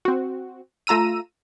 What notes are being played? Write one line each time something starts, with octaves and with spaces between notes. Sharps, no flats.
C4 F#4
A3 F4 A#5 E6 D#7